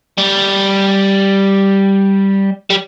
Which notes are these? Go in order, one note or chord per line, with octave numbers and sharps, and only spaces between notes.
G3
G3